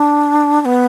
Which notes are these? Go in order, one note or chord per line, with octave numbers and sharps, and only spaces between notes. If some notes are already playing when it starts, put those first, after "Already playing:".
Already playing: D4
D4
B3